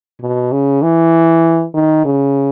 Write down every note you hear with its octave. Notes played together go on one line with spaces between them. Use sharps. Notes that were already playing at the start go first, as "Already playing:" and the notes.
B2
C#3
E3
D#3
C#3